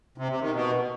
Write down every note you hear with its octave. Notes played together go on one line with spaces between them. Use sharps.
C3
C3
D#3
B2